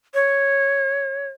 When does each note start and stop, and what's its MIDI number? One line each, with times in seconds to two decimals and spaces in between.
0.14 1.29 73